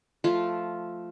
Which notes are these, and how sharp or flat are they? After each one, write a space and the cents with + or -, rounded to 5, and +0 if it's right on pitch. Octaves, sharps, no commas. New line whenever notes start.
F3 +0 A3 +0 F4 +0